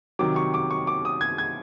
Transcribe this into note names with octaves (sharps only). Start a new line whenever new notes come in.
C3 D#3 F#3 D6
C#6
D6
C#6
D6
D#6
G#6
G#6